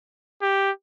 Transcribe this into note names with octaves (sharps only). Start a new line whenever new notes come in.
G4